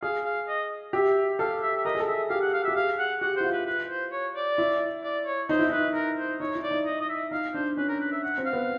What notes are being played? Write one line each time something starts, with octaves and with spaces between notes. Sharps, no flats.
G#4 F5
F5
D#5
G4 E5
A4 F5
E5
E5
A#4 D#5
G#4
A4
E5
G4 F5
F#5
F5
E5
G4
G#4 F5
F#5
G4 F#5
E4 C5
F4
B4
B4
C5
C#5
D5
E4
D5
C#5
D#4 C5
E4
D#4 B4
A#4
C5
D#4 C#5
E4
D5
D#4
D#5
D#5
E5
D#4 F5
D4 C5
C#4 B4
A#4
B4
E5
F#5
C4
F5
B3